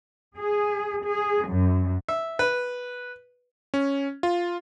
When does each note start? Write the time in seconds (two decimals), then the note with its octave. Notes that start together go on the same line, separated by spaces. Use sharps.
0.36 G#4
1.05 G#4
1.47 F#2
2.09 E5
2.39 B4
3.74 C#4
4.23 F4